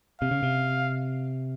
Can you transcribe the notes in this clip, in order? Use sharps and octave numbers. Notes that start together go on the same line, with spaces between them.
C3 F5
C#3
C3